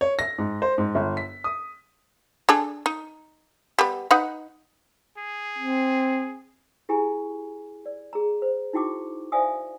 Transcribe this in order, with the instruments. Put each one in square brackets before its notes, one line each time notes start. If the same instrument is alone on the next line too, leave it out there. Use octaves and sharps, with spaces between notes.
[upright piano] C#5
A#6
G#2
C5
G#2
G1
B6
D#6
[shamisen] D4 G#4 A4
D#4
G3 B3
D#4 B4 F#5
[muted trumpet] G#4
[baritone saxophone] C4
[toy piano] E4 G4 G#4 G#5 A#5 C#6
D5
G#4 A#5
C5
D#4 E4 F#4 G5 C#6 D6
C5 D5 E5 F5 G#5 D#6